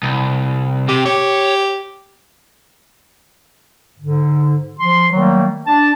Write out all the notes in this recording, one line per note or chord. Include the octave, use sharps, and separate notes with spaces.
C2
C3 G4
G4 C#5
G#2 D3
F3 C6
D#3 F#3 G3 A3 A#3
D4 A5